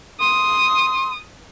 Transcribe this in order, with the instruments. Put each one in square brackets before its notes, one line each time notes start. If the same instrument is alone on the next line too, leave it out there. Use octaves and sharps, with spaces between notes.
[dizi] C6 [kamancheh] D#6